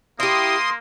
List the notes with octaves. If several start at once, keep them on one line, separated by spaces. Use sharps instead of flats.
A#3 E4 G4 C6 D#6